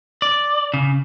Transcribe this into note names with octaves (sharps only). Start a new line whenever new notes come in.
D5
C#3